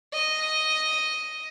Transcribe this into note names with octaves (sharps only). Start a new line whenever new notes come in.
D#5